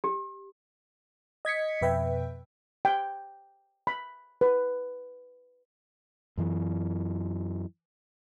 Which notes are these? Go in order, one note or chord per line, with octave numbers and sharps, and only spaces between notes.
G4
D#5 G#6 B6 C#7
F2 B2 B4 E5 G5
G5
B5
B4
F#2 E3